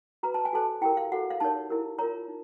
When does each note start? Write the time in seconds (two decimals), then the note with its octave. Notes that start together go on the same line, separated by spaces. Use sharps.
0.23 F#4 B4 A#5
0.34 A5
0.45 G#5
0.53 F#4 A4 C5 A5
0.81 E4 G4 A#4 G5
0.97 F5
1.12 F#4 A4 C5 F#5
1.30 F5
1.40 D#4 G4 A#4 C#5 A5
1.70 E4 G4 A#4
1.99 F4 A#4 C#5 A#5
2.28 D#4